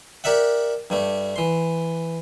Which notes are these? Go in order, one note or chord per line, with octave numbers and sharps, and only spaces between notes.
G4 A#4 D5 E5 F#5
G2 G3 A3
E3 C6